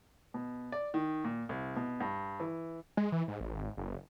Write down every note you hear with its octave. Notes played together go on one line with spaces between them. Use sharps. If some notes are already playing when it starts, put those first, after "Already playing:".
B2
D5
D#3
A#2
C2
B2
G2
E3
G#3
E3
G#2
A1
G#1
F#1